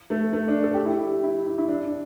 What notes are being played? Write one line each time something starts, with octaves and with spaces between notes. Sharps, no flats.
A3
A3
D4
A4
G4
E4
G4
E4
E4
E4
D4
D4